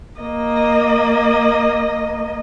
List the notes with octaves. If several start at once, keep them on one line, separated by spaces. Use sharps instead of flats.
A#3 D#5